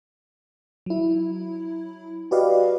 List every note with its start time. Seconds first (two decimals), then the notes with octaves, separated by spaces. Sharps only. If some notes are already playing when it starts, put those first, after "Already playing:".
0.86 F#3 E4
2.31 F#4 G4 B4 D5 D#5 F5